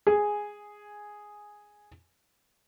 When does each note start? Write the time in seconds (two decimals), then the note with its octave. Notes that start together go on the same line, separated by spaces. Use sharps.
0.07 G#4 G#5